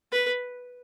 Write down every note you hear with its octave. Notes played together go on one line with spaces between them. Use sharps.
B4